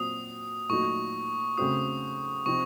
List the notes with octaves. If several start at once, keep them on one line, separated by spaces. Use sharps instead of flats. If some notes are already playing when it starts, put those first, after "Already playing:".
Already playing: A#2 F#3 C4 F#4 D#6
A#2 F#3 A3 D#4 F#4 C#6
C#3 A3 C4 F#4 D#6
C3 F3 C4 D#4 C#6